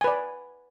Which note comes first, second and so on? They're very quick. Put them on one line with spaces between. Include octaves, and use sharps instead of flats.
G#5 B4 D5